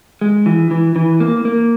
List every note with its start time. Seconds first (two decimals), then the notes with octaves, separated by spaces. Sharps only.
0.21 G#3
0.46 E3
0.71 E3
0.96 E3
1.20 A#3
1.45 A#3